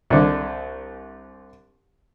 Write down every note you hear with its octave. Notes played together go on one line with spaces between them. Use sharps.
C2 D3